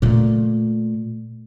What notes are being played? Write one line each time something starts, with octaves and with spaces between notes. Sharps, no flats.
A#2 A3